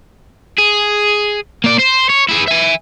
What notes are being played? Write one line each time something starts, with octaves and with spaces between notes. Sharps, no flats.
G#4
A#3 D5
C5
C#5
E4 G#4
E5 G#5